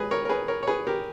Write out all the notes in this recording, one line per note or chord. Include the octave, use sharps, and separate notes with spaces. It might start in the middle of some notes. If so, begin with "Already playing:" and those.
Already playing: G#3 G#4 B4
A#4 C#5
A#4
G#4 B4
A#4 C#5
C#5
G#4 B4
G4 A#4